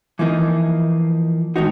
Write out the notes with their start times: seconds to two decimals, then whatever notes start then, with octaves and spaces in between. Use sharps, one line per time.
0.19 E3 F3 A#3 D#4
1.56 G#2 D#3 A3 B3 D#4 F#4